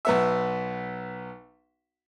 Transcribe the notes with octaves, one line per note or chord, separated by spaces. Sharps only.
B1 B3 E5